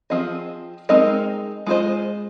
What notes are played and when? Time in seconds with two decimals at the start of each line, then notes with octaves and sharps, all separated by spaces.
0.10 F3 C4 G#4 D#5
0.89 G#3 C4 D#4 A#4 D#5
1.67 G#3 F4 G#4 C5 D#5